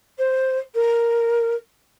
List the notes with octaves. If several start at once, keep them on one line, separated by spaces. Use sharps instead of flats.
C5
A#4